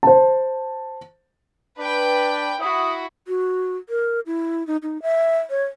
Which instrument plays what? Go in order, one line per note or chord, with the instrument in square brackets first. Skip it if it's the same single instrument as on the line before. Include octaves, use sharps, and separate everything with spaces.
[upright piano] C5 A5
[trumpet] D4 [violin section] B4 G5
[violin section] E4 F#4 [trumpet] D#6
[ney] F#4
A#4
E4
D#4
D#4
E5
C#5